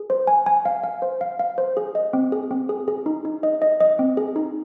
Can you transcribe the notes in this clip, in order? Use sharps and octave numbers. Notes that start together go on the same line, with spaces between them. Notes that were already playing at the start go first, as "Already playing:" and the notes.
Already playing: G#4
C5
G#5
G#5
F5
F5
C5
F5
F5
C5
G#4
D#5
C4
G#4
C4
G#4
G#4
D#4
D#4
D#5
D#5
D#5
C4
G#4
D#4